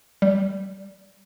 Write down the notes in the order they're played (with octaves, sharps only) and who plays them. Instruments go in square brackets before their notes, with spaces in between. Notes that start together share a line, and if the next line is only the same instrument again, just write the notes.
[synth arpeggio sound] G3